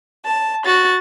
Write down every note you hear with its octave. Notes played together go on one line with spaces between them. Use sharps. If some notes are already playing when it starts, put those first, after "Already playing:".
A5
F#4 A6